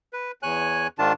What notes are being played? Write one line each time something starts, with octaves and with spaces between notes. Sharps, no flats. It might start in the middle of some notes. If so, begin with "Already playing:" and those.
B4
E2 C#5 G#5 F#6
G#2 D#3 D4 F4 A5